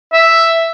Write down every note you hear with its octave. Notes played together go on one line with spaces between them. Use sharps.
E5